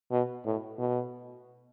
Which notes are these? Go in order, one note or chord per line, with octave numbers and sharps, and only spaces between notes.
B2
A2
B2